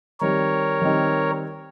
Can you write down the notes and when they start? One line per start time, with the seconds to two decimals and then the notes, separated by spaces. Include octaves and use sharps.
0.21 D#3 G3 C4 D#4 A#4 C#5
0.81 D#3 G3 C4 D#4